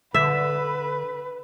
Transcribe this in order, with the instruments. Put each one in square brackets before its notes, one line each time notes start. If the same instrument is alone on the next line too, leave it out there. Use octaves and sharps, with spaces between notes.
[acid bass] D3 [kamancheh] B4 [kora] E5